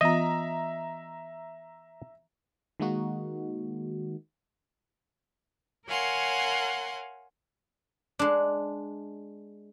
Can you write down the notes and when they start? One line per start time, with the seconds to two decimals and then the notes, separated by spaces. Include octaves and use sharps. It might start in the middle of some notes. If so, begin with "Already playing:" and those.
0.01 E3 B3 F4 D#5 E5 A#5
2.80 D#3 G#3 A#3 D#4 F#4
5.87 A#4 C#5 F5 F#5 G#5 C6
8.19 G#3 D4